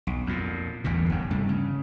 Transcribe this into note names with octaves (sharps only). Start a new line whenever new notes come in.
B1
F2 A#2
A1 E2 G2 A#2
F1 G2
G2 C3 A3
C#3